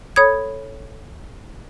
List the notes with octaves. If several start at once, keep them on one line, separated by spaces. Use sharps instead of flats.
A4 C#5 B5 D#6 G#6